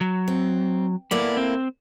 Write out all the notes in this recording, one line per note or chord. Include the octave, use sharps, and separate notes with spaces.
F#3
C4
A2 A#3 B3 E4 D5
C4